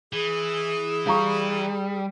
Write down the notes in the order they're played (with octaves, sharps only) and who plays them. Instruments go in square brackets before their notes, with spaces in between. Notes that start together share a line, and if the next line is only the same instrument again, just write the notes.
[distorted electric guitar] E3 [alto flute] G#4
[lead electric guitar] G3 [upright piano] F5 A#5 C#6